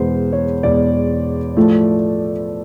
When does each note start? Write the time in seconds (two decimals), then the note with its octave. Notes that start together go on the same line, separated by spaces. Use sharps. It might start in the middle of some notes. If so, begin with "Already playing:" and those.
Already playing: E2 B2 G#3 C5
0.33 C#5
0.63 E2 B2 G#3 D5
1.57 A2 F3 A3